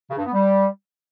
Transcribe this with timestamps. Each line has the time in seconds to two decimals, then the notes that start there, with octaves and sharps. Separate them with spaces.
0.10 C#3
0.18 G2
0.25 B3
0.33 G3